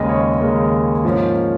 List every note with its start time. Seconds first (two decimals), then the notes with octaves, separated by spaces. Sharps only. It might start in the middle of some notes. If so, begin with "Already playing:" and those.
Already playing: D#2 C#3 G#3 D#5
0.09 C#5
0.40 D#2 C#3 G#3 A#4
1.04 G#2 F3 A#3 C#4